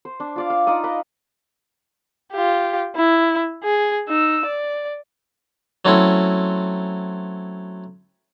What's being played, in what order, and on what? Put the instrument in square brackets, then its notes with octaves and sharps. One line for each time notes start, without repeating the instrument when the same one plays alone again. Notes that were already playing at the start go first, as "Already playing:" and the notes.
[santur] C5
D4
F4 D5 F5
F5
D#4 F4 D5 D#6
B4 D#5 A#5
[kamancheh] F4 G4
E4
G#4
D#4 E6
D5
[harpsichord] F#3 A3 C4 C#4 E4